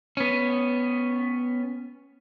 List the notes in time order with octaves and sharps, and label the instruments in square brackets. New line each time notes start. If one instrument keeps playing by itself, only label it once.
[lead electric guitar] B3 C#4